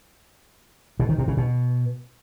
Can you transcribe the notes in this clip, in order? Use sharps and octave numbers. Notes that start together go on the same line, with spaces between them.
B2
D#3
C3
C#3
B2